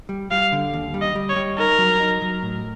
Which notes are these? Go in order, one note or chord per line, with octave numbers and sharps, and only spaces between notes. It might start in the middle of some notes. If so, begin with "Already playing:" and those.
G3
G3 F5
D3
D#2
G3
D#5
G3
C#5
G3
D#4 A#4
F#3
D#4
F#3
A2